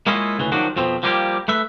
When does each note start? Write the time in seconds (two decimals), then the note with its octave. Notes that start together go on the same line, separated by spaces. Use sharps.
0.07 G#3 A#3 C#4 E4 F4 D#5
0.39 D2 C#3 E3
0.52 D#3 F3 F#3 D4 F#4
0.76 F2 B2 F3 C4
1.03 F3 G3 A#3 F4 G4
1.48 A3 B4 E5